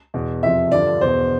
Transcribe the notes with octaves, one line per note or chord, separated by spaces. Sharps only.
E2 B2
F2 C3 F3 E5
G2 D3 F3 D5
E2 B2 C5